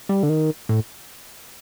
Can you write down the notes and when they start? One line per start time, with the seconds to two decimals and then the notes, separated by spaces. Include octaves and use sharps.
0.09 G3
0.23 D3
0.29 D#3
0.69 A2